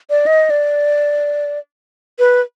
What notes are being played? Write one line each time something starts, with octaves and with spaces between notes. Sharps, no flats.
D5
D#5
D5
B4